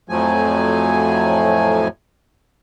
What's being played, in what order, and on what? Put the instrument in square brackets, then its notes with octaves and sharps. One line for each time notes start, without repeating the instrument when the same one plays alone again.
[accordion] F2 A2 F3 F#3 A3 G#5